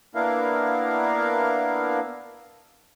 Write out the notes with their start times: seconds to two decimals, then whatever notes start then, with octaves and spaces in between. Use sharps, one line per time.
0.15 A#3 B3 D4 E4 A#4 F5